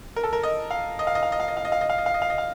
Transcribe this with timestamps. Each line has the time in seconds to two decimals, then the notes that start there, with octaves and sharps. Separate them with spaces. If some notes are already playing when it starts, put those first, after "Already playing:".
0.16 A#4
0.23 A4
0.33 A#4
0.43 D#5
0.71 F5
0.99 D#5
1.07 F5
1.15 D#5
1.23 F5
1.32 D#5
1.40 F5
1.48 D#5
1.57 F5
1.65 D#5
1.72 F5
1.81 D#5
1.90 F5
1.98 D#5
2.06 F5
2.14 D#5
2.22 F5
2.30 D#5
2.38 F5